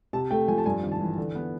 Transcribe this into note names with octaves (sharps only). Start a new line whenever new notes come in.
C3 A5
A3 G5
F3 G#5
A5
G2 G#5
G#1
A5
E3
D3
B3